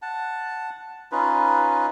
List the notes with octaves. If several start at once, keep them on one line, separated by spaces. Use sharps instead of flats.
F#5 A5
C#4 D#4 F4 B4